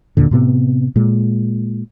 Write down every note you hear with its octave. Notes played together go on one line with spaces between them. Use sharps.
D#2 A#2 D3
A2 C3 B3
A#2 G#3